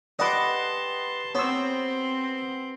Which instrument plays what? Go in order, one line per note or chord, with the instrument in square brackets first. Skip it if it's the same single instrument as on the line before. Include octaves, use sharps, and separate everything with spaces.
[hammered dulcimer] G4 B4 [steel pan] D5 D6 [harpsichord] D#5 F#5 [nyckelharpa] A5 C6
[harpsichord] B3 [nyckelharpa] C4 C6 [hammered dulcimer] C5 [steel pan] C#5 E6